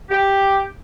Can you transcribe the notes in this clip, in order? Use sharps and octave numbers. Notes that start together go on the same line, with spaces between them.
G4